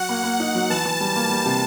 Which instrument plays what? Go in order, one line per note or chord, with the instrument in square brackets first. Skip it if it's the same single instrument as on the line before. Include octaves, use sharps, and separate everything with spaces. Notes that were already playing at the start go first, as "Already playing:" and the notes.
Already playing: [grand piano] F#3 F#4 [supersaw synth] F#5
[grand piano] A#3
[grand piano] A#3 [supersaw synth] F#5
[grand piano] D#4
F#3
[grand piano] E3 [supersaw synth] A5
[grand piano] E3
G3
[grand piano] A#3 [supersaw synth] A5
[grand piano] G3
C3